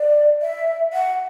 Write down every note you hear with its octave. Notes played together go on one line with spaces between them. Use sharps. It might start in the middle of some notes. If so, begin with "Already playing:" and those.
Already playing: D5
E5
F#5